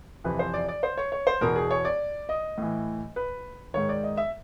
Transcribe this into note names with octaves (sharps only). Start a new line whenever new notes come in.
F2 C3 E3 B4
C5
D5
D5
C5
C#5
C#5
C5
E2 B2 A#4
G#4
C#5
D5
D#5
A2 E3
B4
G#2 D#3 C#5
D5
D#5
E5